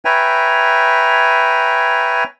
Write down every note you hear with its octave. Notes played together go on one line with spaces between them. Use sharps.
B4 C#5 E5 G5 G#5 A#5